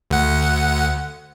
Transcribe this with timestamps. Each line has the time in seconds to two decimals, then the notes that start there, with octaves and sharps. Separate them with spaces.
0.11 D2 F#5